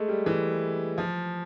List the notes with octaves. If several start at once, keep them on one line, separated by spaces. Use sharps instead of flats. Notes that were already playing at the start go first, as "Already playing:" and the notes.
Already playing: G#3 A3
G3
E3
F3